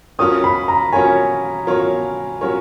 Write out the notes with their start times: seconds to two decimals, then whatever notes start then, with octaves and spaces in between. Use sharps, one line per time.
0.19 F#3 C#4 F4 A#4 C#5 D#6
0.44 B5
0.68 A#5
0.93 F#3 C#4 F4 A#4 C#5 G#5
1.67 F#3 C#4 F4 A#4 C#5
2.41 F#3 C#4 F4 A#4 C#5